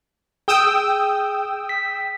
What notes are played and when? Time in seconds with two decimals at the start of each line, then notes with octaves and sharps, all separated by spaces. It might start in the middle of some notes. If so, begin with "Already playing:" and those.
0.48 G#4 G5 D#6 E6
1.69 B6